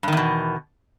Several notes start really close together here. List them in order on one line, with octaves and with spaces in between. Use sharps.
G2 D#3 E2 B2